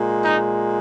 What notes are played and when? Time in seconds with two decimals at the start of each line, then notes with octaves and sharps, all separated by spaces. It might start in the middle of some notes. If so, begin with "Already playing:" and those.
Already playing: A#2 G#3
0.23 D#4